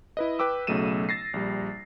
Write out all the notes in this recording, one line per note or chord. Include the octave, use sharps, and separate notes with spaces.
E4 B4 D#5
B4 G5 D6 E6
B1 C#3 F#3 A3 D#7 E7
A6 A#6 C7
A#1 G3